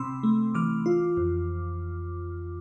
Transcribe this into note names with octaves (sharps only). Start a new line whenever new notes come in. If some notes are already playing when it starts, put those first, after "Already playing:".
Already playing: C3 C4 B5 C6 D6 E6
A3
E3 D6 F6
F4
F2